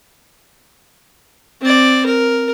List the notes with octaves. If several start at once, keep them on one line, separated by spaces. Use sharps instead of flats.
C4 D5
A#4